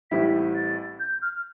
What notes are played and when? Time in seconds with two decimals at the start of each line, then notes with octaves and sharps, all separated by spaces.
0.11 A1 A2 G3 C4 E4 B6
0.56 A6
1.00 G6
1.22 F6